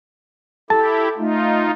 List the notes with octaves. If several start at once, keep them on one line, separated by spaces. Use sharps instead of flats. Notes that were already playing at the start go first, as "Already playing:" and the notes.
E4 G4 A4 A5
A3 D#4 F4